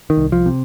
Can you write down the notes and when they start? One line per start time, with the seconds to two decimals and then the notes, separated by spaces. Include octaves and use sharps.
0.10 D#3
0.17 C2
0.32 F3
0.46 C3